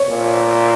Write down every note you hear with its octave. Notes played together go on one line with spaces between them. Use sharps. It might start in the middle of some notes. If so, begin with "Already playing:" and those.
Already playing: C#5
A#2